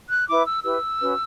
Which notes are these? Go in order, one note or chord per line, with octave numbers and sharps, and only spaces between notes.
F#6
E4 B4 D6
E6
E4 G4 B4 E6
C#4 F#4 B4